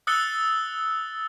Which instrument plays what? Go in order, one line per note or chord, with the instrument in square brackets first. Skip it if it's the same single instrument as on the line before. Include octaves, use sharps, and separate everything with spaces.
[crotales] D#6 E6 F#6 A6 C#7 G7